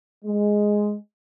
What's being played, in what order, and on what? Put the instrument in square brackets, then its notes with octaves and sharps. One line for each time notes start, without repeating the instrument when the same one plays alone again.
[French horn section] G#3